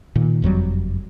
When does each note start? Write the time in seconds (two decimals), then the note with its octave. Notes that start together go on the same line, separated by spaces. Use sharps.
0.16 A#2 D#3
0.42 F#1 F2 F#3 G3